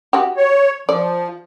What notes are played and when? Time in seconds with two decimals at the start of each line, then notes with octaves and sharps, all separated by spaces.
0.13 F#4 G4
0.37 C#5
0.89 F3 D5